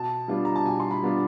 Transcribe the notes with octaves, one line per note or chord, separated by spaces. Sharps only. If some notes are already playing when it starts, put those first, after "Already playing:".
Already playing: B2 A5
G3 B3 D4 F4
A#5
A5
B2 G#5
C6
B5
G3 B3 D4 F4